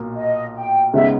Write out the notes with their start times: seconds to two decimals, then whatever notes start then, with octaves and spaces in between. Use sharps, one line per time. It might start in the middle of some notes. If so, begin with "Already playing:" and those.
Already playing: B1 A#2 A#3
0.18 D#5
0.56 G5
0.93 C#2 C#3 G#3 B3 D#4 E5